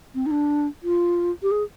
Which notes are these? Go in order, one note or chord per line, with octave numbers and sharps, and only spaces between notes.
C4
D#4
D4
F4
G4
G#4